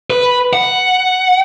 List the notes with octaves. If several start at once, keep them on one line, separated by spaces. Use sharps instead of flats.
B4
F#5